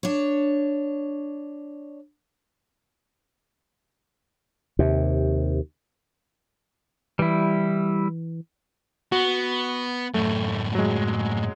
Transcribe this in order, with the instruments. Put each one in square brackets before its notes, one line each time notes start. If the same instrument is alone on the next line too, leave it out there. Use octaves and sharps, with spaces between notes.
[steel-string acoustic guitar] D4 C#5
[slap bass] D#2 C3
[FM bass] E3 [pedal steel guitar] G3 E4
[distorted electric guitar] B3 [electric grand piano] F#4
[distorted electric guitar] F#2 A2 [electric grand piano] A3
[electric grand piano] F#3 G#3